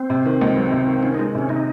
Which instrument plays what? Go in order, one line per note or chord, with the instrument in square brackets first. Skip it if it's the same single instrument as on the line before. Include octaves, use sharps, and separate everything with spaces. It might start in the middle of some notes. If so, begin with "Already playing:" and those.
Already playing: [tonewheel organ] C4
[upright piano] C3
D#3
C#2
F#3
C3
D#3
[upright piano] D#3 [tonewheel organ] C#4
[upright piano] G#3 [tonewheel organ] D#4
[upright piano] C3 [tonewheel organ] C#4
[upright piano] C3 [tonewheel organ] D#4